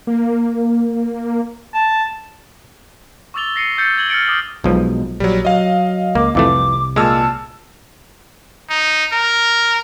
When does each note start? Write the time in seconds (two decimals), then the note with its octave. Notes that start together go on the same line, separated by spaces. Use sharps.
0.07 A#3
1.74 A5
3.34 C#6 D6 E6 A6 F7 G7
3.56 A#6 C7 C#7 D#7
3.78 E6 G6 A6 C#7 G7
3.98 G#6 F#7 G7
4.10 F6 G#6 A6 C#7 D7
4.26 D6 D#6 F6 F#7
4.64 B1 B2 F3 G#3
5.20 A#1 F#3 G3
5.45 F#3 D#5 F5
6.15 C#2 A#3 D6
6.35 C2 F2 E3 A3 D6
6.96 A#2 G#3 A5 E6 F6
8.70 D#4
9.12 A#4